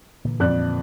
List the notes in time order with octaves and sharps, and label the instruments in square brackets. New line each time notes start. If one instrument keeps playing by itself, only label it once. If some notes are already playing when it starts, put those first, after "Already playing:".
[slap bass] A#2 D3 E3
[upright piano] F2 D5 F#6